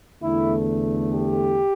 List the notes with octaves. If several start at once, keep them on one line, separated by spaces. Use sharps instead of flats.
E2 D3 A3 E4
G4